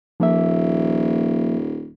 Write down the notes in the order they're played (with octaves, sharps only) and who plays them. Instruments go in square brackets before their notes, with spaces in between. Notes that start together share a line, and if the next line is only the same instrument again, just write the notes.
[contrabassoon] D#1 [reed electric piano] F3 A#3 E5